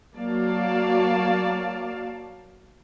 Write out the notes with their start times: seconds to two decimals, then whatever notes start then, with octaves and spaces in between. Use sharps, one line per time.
0.17 F#3 A#3 F#4 D5 F5 A5